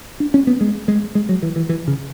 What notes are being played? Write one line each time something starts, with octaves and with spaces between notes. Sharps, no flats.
D4
C#4
B3
G#3
G#3
G#3
F#3
E3
E3
E3
C#3